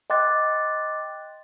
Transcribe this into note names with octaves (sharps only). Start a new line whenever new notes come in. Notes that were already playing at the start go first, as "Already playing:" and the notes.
D#5 G5 C6 D6 F#6 A6